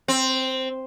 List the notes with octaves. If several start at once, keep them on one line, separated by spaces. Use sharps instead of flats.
C4